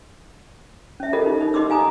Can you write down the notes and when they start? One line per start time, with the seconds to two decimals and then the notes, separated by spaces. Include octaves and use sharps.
1.00 C#4 E5
1.13 F4 G4 A4 A#4 D#5
1.26 D#4
1.41 D#4
1.54 G4 D#5 C6 D6 E6
1.70 F5 G#5 A#5 D#6